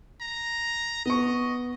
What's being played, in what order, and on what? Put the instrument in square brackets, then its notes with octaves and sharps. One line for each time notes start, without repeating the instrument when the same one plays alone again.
[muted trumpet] A#5
[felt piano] B3 C#6 [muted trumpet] D#5